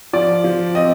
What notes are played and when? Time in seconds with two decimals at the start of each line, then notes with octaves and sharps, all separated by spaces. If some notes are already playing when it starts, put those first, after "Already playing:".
0.13 F3 D5
0.44 F3
0.74 C4 D#5